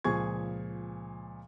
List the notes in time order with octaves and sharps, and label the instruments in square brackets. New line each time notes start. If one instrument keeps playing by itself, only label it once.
[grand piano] C#2 A#2 F3 G#4 C#6 G#6